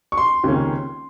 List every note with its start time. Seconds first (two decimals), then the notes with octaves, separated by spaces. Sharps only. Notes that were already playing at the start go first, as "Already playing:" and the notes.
0.12 C#6
0.18 C6
0.44 C#2 C3 D#3 A#3 C#4